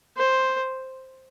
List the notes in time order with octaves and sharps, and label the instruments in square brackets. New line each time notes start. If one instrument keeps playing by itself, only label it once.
[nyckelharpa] C5